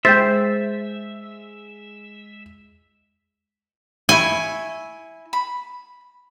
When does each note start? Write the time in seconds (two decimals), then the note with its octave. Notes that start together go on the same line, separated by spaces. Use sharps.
0.05 G#3 C5 E5 G5 G6 A6
4.09 E4 G#5 C#6
5.33 B5